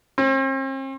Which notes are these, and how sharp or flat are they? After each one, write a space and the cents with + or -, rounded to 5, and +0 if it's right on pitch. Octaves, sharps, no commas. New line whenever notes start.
C4 +45